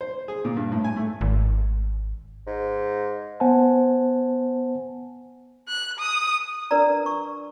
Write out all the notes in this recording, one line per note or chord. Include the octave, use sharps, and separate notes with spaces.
C5
G#4
A#2
G2
A2
G#5
A3
G#1
G#2
B3 C5 F#5 G#5 A5
F#6
D#6
D4 A#4 B4 D5 A#5
C#6